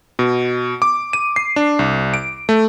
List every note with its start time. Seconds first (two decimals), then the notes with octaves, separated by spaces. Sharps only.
0.19 B2
0.82 D6
1.13 D#7
1.36 C7
1.56 D4
1.79 C2
2.14 D7
2.49 A3